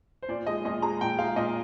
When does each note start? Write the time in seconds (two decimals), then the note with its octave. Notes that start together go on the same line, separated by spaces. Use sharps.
0.23 C5
0.29 A#2 D5
0.46 G#3 D#5
0.65 A#2 D#5
0.82 G#3 A#5
1.01 A#2 G5
1.18 G#3 F5
1.36 A#2 D#5